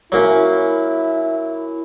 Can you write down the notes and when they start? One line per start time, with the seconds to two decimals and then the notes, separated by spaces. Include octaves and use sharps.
0.12 F#3 A#3 C#4 E4